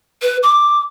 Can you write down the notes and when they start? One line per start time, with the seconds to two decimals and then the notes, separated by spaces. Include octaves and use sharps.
0.22 B4
0.43 D6